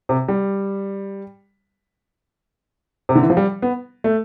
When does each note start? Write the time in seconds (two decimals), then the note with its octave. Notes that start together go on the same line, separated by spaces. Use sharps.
0.09 C3
0.28 G3
3.09 C3
3.15 D3
3.23 E3
3.30 F3
3.37 G3
3.62 B3
4.04 A3